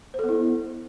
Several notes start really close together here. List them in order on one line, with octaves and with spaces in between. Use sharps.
C5 A4 B3 E4